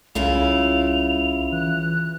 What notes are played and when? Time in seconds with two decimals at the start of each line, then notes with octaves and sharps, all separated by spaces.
0.15 C2 C#3 E4 F4 F7
1.52 E3 F#6